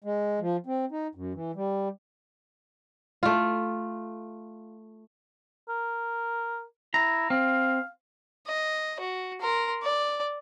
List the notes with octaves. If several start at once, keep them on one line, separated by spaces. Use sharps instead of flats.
G#3
F3
C4
D#4
F#2
E3
G3
A3 F4
A#4
E4 A#5
C4 F5
D#5
F#4
A#4 C6
D5